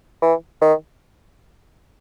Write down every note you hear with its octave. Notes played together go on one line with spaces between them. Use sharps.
E3
D#3